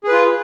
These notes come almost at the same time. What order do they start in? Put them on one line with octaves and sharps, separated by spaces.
G#4 B4 F4